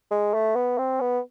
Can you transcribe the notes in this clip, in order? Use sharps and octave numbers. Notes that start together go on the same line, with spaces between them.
G#3
A3
B3
C4
B3